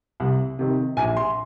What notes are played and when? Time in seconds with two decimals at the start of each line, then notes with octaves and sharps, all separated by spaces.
0.20 C2
0.59 C3 D#3
0.97 A#1 G#5
1.17 C6